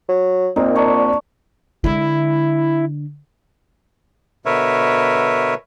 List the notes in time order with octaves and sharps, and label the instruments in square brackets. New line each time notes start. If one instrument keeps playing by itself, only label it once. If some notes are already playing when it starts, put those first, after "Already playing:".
[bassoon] F#3
[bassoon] A#2 [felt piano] A#3 C4 [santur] D#4
[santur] D4 C#5 A#5
[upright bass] D3 G#3 [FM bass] E4
[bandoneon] B2 D3 A#4 B4 C#5 E5